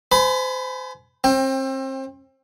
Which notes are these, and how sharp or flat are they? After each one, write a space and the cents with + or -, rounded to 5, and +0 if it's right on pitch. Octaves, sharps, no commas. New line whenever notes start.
C5 -30 G#5 +25 B5 +10
C4 +30 G5 +20